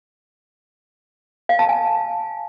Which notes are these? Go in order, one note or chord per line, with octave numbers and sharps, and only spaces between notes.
F5
A5
G#5